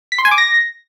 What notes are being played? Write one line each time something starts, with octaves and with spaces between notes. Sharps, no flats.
B6
C6
G#5
D6
A#6